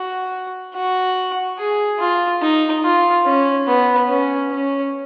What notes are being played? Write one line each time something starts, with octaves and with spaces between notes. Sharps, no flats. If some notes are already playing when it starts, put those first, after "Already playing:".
Already playing: F#4
F#4
G#4
F4
D#4
F4
C#4
B3
C#4
C#4